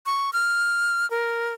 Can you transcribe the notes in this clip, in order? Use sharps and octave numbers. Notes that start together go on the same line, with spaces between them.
C#6
F6
A#4